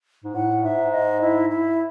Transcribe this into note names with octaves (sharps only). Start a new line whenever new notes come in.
G#2
A2 F#5
G#2 E5
D#5
E4
E4